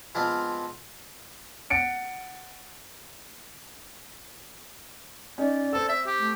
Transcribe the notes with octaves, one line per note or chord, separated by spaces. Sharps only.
F3 G#3 B3 C4 D4 F4
F#5 A6 C#7 D7
C#4 D#4 D5
C4 A4 E6
E5
G4
A3